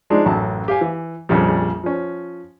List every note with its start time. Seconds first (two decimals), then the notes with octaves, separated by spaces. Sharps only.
0.10 F3 G#3 D4 D#4
0.25 A1 F#2 F#3 A5
0.68 G4 F5 G#5
0.81 E3
1.29 A#1 F2 C#3 G3
1.83 F3 C#4